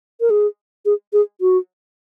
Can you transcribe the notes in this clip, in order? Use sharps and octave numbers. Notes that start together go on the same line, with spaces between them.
A#4
G#4
G#4
G#4
F#4